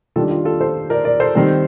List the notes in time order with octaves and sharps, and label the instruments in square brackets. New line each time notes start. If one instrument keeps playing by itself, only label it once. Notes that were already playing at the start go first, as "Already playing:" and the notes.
[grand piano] D#3 G3 D4 F4 A4
F4
F4 A4
A4 C5
A#4 D5
A#4 D5
A4 C5
D#3 G3 C4